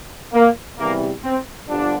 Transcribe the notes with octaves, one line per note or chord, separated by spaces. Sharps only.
A#3
E2 C3 E3 G3 A#3
C4
G1 G2 D3 F3 D4